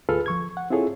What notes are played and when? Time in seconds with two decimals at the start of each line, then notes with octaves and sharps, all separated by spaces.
0.09 D2 F4 G#4 A4 B4 F6
0.26 F3 C#6 G#6
0.57 F#5
0.70 C4 E4 F4 G#4 A4 C#5